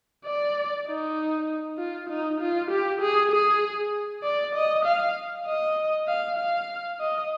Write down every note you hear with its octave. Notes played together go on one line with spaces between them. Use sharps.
D5
D#4
F4
D#4
F4
G4
G#4
G#4
D5
D#5
F5
D#5
F5
F5
D#5